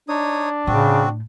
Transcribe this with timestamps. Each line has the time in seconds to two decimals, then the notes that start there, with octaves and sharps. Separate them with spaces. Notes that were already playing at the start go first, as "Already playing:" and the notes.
0.09 D4 D#4 C#5 D#6
0.67 A2 C#3 C4 F#4